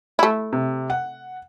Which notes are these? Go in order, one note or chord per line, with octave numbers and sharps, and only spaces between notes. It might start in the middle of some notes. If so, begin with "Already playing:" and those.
A3 E4
C3
F#5